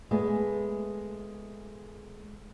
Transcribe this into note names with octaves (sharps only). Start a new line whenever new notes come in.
G#3 A3 B3